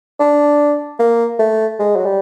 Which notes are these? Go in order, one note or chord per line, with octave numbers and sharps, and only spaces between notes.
D4
A#3
A3
G#3
F#3
G3